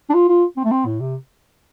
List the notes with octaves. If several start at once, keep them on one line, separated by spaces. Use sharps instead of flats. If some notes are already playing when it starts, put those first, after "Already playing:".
D4
F4
F4
C4
A3
C4
A2
C3